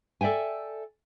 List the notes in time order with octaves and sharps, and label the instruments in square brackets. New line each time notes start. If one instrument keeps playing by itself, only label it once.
[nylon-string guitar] A4 D5 E5 G5 G#5